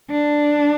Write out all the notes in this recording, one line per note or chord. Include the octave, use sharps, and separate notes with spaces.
D4